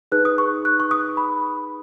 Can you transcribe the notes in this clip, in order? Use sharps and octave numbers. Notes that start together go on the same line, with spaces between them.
D#4 G#4 B4 F#6
D#6
C#6
F#6
C#6
D#6
B5